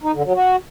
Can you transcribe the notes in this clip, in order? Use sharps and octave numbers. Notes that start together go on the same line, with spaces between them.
D#4
D3
F#3
F#4